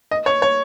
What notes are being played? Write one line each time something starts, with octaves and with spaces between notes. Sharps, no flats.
D#5
C#5
C#5